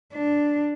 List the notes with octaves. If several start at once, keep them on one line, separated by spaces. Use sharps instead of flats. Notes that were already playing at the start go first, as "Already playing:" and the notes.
D4